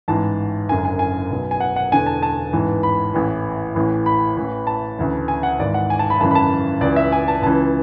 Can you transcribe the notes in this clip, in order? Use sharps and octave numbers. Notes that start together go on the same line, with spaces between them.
A1 G#2 E3 A5
F#1 F#2 D3 G#5
G#5
G#5
B1 B2
G#5
F#5
F#5
E1 E2 D3 G#5
A5
A5
A1 G#2 E3
B5
A1 A2 E3
A1 A2 E3
B5
A1 A2 E3
A5
D2 C#3 E3
G#5
F#5
G#1 G#2 E3 D5
F#5
G#5
A5
B5
G#1 F#2 C#3 E3 A5
B5
A5
C#2 C#3 E3 D5
E5
G#5
A5
C#2 C#3 E3 A5